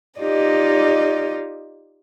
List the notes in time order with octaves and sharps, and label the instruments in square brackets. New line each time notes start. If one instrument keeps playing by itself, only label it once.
[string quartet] D#4 F4 G4 D5 D#5